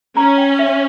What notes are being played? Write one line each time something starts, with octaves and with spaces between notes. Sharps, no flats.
C#4 A#5
G5
E5